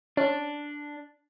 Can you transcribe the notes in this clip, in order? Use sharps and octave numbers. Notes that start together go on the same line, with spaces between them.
C#4 D4